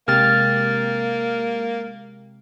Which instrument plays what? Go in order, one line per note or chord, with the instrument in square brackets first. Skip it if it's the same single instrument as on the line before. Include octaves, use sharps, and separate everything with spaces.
[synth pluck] C3 G#3 G4 [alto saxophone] A#3 [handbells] F6 A6